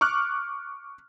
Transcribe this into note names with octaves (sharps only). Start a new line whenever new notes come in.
C#6 D6 F6 F#6